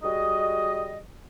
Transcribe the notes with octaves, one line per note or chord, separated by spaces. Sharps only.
G3 F#4 G#4 D#5